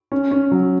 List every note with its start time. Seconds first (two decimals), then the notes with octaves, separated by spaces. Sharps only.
0.12 C#4
0.31 C#4
0.51 F#3